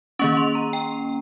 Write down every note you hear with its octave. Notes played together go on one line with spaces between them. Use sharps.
D#3 A#3 C#4 C#6
C6
A#5
G5